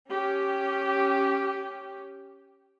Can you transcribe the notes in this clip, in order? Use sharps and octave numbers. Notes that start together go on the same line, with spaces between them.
C#4 G4